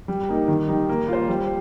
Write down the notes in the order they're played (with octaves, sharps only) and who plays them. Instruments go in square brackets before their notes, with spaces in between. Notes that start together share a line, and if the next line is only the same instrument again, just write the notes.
[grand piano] G3
A#3 D#4
D#3
G3 D#4
A#3
F4 C5
G3